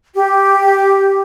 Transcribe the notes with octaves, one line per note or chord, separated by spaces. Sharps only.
G4